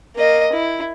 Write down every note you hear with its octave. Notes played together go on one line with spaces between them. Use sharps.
A#3 D#5
E4